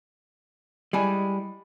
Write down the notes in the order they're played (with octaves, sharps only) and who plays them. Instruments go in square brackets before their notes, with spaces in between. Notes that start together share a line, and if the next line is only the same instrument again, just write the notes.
[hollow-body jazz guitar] G3 [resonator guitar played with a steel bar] G#3 E4 G#5